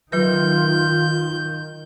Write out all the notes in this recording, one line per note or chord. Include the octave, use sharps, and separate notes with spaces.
D#3 F#3 F4 B4 G6